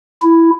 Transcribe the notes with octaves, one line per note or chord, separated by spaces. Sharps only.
E4